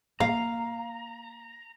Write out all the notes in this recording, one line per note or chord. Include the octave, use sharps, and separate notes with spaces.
A#3 F5 A#5